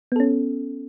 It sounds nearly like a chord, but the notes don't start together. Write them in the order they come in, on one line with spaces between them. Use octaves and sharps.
B3 A4 C#4